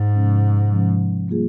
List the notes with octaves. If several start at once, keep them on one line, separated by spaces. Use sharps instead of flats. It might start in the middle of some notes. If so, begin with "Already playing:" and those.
Already playing: G#2
C3 F3 G#3 C#4
C3 F3 G#3 C#4
G3 A#3 F4 G#4